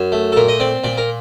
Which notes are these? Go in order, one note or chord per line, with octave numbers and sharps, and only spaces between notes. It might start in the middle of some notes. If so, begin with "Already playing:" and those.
Already playing: F#2
A3
A4
A#2 A#4
D#5
C4 D5
A#2 D5
A#4